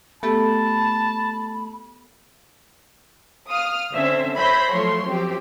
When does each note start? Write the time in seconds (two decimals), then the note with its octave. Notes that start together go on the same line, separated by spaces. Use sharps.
0.23 A3 B3 G4 A4 A5 B5
3.47 F5 D#6 F6
3.94 D3 C4 C#4 C5 E5
4.37 C5 C#5 E5 B5 G6 A#6
4.72 F3 F#3 A3 C#5 C6
5.06 F#2 F3 C4 G4